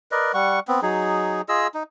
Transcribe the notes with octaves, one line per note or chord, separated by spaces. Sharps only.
A#4 B4 D5 D#5
G3 F#5 C#6
B3 C4
F#3 D#4 G#4
F4 G#4 D#5 E6
D#4